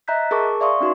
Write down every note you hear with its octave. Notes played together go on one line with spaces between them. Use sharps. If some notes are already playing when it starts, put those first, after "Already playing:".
D#5 E5 A#5 F#6 G6 B6
G#4 A#4 A5 C#6 D6
D5 E5 F5 C6 C#6 D#6
C#4 D#4 F#4 B4 C6